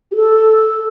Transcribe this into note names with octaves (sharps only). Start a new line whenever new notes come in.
G4
A4